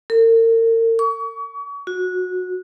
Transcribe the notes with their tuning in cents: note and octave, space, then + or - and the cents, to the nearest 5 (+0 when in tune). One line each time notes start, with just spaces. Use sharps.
A#4 -40
C#6 +35
F#4 -20